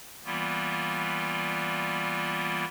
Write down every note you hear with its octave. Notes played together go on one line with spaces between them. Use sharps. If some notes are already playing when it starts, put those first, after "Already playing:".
E3 G3 A#3 B3 F4